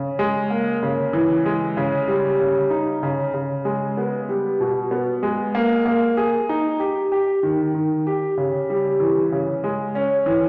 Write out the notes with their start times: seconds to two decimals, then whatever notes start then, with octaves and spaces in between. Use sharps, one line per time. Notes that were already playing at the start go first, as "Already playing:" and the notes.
Already playing: C#3
0.19 G#3
0.50 A#3
0.83 C#3
1.13 E3
1.46 G#3
1.77 C#3
2.08 G3
2.40 C#3
2.70 D#4
3.03 C#3
3.34 C#3
3.65 G#3
3.97 B3
4.29 G3
4.60 B2
4.91 B3
5.23 G#3
5.55 A#3
5.86 A#3
6.17 G#4
6.49 D#4
6.80 G4
7.12 G4
7.43 D#3
7.74 D#3
8.07 G4
8.38 C#3
8.70 G3
9.00 E3
9.32 C#3
9.64 G#3
9.95 C#4
10.26 E3